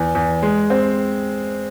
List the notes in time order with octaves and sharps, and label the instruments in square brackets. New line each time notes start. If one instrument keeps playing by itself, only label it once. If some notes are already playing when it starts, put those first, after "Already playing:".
Already playing: [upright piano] E2
E2
G#3
C4